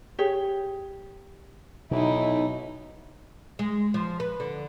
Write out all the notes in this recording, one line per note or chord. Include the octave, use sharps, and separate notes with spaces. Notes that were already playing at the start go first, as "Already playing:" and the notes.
G4 G#4 C#5
B1 B2 D#4 E4
G#3
F3
B4
D3